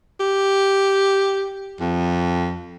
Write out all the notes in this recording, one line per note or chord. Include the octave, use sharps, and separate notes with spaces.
G4
F2